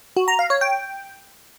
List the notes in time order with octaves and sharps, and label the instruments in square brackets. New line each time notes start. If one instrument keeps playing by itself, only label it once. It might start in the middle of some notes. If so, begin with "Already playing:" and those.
[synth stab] F#4
A#5
F5
C#5
G5